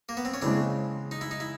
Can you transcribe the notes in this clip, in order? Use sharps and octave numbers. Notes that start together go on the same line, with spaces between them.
A#3
B3
C4
C#4
C#3 E3 G#3 C4 D4
D#4
E4
D#4
E4